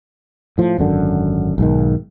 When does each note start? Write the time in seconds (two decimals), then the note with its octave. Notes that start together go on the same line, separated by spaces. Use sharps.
0.58 A2 F3
0.78 G#1 F#2 D3
1.58 B1 G#2 D#3